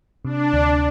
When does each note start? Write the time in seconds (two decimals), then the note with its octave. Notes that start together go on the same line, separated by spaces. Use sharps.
0.25 C3 D4
0.53 D2